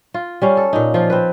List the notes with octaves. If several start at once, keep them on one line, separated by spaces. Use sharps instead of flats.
F4
G3 C#4 F5
A4
A#2 D#4
F3 F4
C4 B4